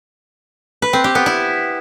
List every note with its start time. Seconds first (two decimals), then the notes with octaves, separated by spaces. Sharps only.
0.82 B4
0.93 C4
1.04 G4
1.15 B3
1.26 E4